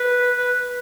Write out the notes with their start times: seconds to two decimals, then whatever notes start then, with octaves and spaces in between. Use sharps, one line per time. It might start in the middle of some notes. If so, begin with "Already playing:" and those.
Already playing: B4
0.36 B4